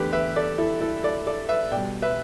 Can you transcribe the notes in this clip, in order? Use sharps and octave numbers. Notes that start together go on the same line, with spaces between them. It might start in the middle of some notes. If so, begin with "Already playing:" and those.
Already playing: E2 D3 A3 G4 B4
B4 E5
A4 D5
E4 A4
E4 A4
A4 D5
A4 D5
B4 E5
B2 G3 D5 G5
B4 E5